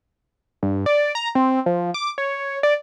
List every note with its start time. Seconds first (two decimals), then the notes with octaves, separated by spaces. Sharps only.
0.63 G2
0.86 D5
1.15 A#5
1.35 C4
1.66 F3
1.94 D6
2.18 C#5
2.63 D5